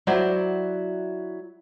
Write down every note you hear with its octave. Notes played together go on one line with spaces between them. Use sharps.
F#3 E4 F#4 C5 D5 E5